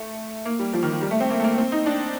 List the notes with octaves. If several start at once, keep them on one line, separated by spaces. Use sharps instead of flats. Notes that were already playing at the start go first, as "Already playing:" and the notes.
Already playing: A3
A#3
G3
F3
D#3
F3
G3
A3
C4
A#3
A3
A#3
C4
D#4
D4